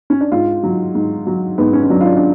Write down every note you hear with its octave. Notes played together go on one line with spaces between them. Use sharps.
C#4
D4
G#2 F4
F#3
G#2
F#3
G#2 B3
C#4
C#4
F#3 D4
F4
D4
D4